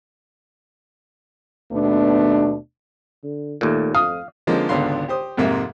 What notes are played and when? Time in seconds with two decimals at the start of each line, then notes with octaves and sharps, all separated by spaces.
1.72 D#2 B2 A3 B3 D4
3.23 D3
3.61 D#2 A#2 A3
3.95 F2 F5 D#6
4.47 D3 F3 G#3 A#3 C4 C#4
4.69 G#1 C#2 D3 B3 F5 C6
5.08 G4 C5 D#6
5.37 F2 G#2 C3 A#3 E5